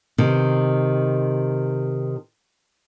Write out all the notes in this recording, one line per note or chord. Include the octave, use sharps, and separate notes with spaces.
C3 D#3